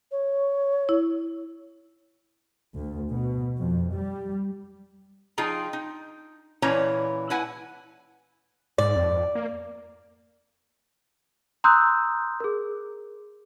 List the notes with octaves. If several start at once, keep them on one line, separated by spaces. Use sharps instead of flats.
C#5
E4
D2
B2
F2
G3
F3 D#4 F4 G#4 G5 A#5
D#4
A#2 E3 C#4 C#5 A#5
E4 B4 F#5 G#5
G#2 D5
F2
A#3
A#5 C6 D#6 E6 F#6 G6
G#4 A#4